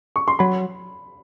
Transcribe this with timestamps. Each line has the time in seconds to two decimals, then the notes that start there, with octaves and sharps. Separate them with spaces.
0.16 C#6
0.28 C6
0.39 F#3 B5